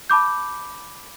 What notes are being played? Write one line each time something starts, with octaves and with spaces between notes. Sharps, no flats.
A5 B5 D6 G6